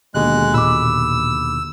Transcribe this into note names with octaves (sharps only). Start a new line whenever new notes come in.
D#2 B2 D3 G#3 F#6
A#2 B5 D6 E6